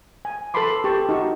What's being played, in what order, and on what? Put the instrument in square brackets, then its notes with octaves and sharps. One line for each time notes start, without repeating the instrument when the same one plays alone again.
[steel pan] G#5
A4 B4 A5 B5 C6 D6
G4 A4 A5 C#6
D#4 F#4 C#6